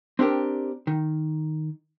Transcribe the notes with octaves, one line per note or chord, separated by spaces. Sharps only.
C4 D4 G4 A#4
D#3